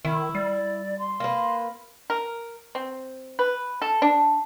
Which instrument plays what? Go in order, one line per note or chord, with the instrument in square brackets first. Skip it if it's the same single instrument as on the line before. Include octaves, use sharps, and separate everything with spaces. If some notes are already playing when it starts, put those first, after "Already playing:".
[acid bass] D#3 [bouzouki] E4
[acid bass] G3 [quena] D5
[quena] C6
[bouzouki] A#3 B4
[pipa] A#4
C4
B4
A4
D4